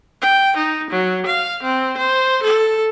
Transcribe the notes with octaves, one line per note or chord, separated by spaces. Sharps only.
G5
D#4
F#3
F5
C4
C5
A4